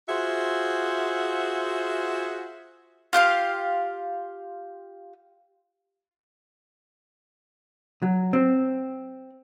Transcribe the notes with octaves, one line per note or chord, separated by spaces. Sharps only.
F4 F#4 G#4 C5 E5 F#5
F4 G4 F5 C6
F#3
C4